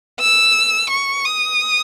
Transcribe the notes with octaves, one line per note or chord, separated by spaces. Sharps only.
E6
C#6
D#6